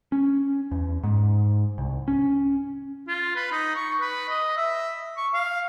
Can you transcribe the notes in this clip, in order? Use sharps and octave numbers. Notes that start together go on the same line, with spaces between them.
C#4
E2
G#2
C2
C#4
F4
B4
D#4
C#6
B4
D#5
E5
C#6
F5